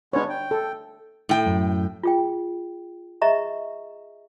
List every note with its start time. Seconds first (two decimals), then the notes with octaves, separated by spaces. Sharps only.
0.13 G#3 B3 C#4 D4 C#5
0.29 G5
0.51 A4
1.29 A2 G5
1.46 F#2
2.04 F4 G#4 G5
3.22 G#4 D#5 E5 A#5 C#6